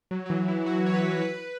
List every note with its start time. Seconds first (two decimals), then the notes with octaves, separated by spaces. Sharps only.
0.11 F#3
0.26 F#3
0.30 E3
0.48 E4
0.66 F#4
0.86 C#5
0.94 B4
1.21 B4